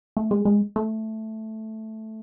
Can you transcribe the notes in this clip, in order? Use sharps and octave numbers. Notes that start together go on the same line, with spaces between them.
A3
G#3
G#3
A3